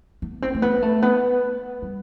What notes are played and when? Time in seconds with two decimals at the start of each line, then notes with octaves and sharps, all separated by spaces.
0.22 B3
0.42 C4
0.54 A3
0.62 B3
0.82 A3
1.02 B3
1.82 G3